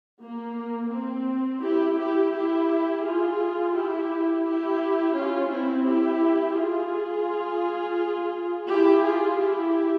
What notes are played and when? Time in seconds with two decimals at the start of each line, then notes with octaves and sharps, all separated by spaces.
0.23 A#3
0.92 C4
1.63 E4 G4
1.99 E4 G4
2.33 E4 G4
3.04 F4 G#4
3.75 E4 G4
4.45 E4 G4
5.15 C#4 F4
5.51 C4 E4
5.86 E4 G4
6.57 F4 G#4
8.68 E4 G4
9.04 F4 G#4
9.39 E4 G4